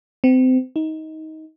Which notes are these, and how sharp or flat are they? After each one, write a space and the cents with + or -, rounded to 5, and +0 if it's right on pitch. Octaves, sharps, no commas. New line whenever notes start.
C4 -30
D#4 +20